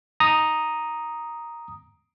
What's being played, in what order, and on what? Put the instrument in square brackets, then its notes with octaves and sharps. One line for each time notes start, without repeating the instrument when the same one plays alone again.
[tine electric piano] A#5 D#6